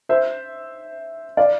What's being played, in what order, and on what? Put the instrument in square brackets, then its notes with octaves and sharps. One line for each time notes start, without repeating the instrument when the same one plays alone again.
[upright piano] C5 E5
D5 F5